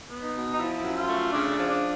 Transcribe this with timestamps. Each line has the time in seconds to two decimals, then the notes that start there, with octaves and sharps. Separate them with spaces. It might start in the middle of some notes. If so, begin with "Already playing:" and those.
0.10 B3
0.22 D#4
0.34 B2
0.52 D#4
0.59 F3 E4
0.83 F#2
0.95 F4
1.08 A3
1.33 C#3 D4
1.57 F3
1.69 D4